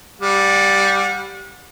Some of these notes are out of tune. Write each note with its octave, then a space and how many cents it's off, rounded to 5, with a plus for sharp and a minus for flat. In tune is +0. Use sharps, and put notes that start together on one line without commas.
G3 +0 F#5 -35